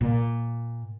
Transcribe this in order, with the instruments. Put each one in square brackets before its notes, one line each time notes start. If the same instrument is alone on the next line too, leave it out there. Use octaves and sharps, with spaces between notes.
[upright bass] A#2